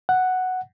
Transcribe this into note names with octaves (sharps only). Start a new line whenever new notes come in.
F#5